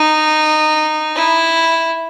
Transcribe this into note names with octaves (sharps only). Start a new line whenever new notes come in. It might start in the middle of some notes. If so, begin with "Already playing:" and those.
Already playing: D#4
E4